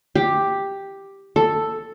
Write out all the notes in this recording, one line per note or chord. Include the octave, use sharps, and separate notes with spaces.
G4
A4